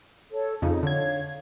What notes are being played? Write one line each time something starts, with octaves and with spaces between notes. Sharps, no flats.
A4 C#5
F2 C#3 D#4
D3 C#5 F5 G#6